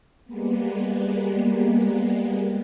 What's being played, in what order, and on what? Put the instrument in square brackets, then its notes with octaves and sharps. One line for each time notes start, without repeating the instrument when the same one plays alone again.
[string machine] G3 G#3 A#3 B3